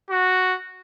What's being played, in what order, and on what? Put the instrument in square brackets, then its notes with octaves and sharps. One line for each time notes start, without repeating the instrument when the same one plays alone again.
[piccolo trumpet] F#4